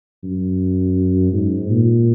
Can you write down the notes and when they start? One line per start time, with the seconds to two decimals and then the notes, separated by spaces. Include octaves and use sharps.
0.23 F#2
1.33 G#2
1.69 A#2